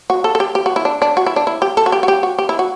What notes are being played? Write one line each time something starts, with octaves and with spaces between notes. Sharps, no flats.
F#4
A4
A4
G4
G4
F#4
E4
D4
D4
F#4
E4
D4
E4
G4
A4
F#4
G4
F#4
G4
F#4
G4
E4
F#4